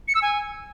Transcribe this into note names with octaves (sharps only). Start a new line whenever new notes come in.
C#7
E6
G#5